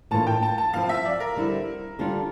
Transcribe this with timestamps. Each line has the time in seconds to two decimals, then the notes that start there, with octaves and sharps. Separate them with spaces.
0.11 A2 E3 A#3 D4 F4 A5
0.27 G5
0.43 A5
0.58 A5
0.73 F3 C4 E4 F5
0.89 E5
1.05 D5
1.20 A#4
1.36 D3 G3 C4 E4
1.99 D3 G3 D4 F4